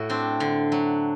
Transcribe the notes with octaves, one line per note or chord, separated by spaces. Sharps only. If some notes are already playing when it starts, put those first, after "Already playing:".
Already playing: A2 F#4
C4 D4
D3
F#3